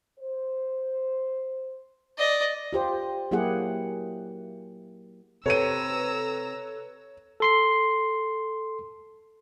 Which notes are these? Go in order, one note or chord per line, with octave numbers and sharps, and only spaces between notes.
C5
D5 D#5
F4 G4 C5
F#3 A#3 E4 G4 G#4 F#5
C3 A4 B4 C#5 A#5 E6 D#7
A4 C6 C7